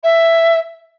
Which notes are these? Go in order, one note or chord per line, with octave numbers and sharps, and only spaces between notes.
E5